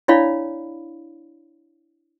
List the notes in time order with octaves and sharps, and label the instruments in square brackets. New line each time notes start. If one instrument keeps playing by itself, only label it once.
[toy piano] D4 E4 C#5 D5 F5 B5